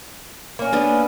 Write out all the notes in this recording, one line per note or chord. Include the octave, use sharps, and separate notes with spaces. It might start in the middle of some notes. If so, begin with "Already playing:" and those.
A#3 C#4
B3 D4 A4